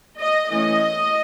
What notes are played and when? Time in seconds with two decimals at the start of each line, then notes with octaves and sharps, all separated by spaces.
0.19 D#5
0.50 E3 A3 C#4 D#5